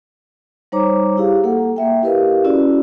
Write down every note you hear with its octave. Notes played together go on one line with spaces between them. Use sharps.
G3 D#4 C5 C#5 A#5 D6
E4 G4 G#4 F5
A#3 A4 F#5
A#3 E5 G5
E4 G4 A#4 B4 D#5 F5
C#4 E4 F#4 G#4 D5